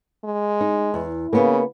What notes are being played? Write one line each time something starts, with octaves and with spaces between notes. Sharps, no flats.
G#3
D#4
E2
C#3 A#3 B3